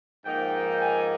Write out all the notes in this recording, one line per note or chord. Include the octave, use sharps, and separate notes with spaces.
G#2 F3 A#3 D#4 G5
G#5